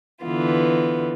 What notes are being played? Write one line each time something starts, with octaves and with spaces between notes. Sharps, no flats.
D3 E3 B3 F4